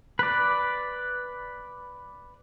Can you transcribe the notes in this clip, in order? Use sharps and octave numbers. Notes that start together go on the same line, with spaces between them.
B4 D5